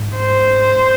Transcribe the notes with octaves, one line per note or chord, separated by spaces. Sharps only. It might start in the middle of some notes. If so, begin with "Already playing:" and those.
Already playing: G#2
C5